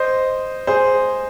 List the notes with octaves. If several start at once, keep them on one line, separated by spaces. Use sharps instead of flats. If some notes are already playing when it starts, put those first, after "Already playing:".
Already playing: C5 D#5
G#4 C5